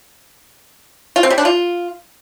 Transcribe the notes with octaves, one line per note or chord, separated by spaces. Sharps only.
F4
C4
G3
D4
F4